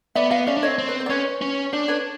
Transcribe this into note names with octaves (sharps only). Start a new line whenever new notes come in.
B3 D5 E5
B3 D#5 F5
C#4 D5 E5
D4
C4 C#5 D#5
C4
B4
C5
D5
C#4 B4 C#5
C#4
D4 C5
B4 C#5